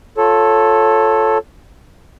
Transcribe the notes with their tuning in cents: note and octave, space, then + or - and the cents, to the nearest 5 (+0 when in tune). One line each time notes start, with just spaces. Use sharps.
F4 +15 A4 +0 C#5 -10